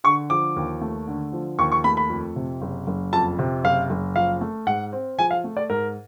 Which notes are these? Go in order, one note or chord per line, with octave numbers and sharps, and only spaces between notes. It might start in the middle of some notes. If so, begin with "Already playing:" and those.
D3 C#6
F3 D6
D#2
A3
D3
F3
D#2 C#6
C#6
A3 B5
B5
F2
C3
F#1
F#1
F2 A5
C3
F#1 F5
F#1
F3 F5
A3
G#2 F#5
C4
F3 G#5
F5
A3
D5
G#2 A#4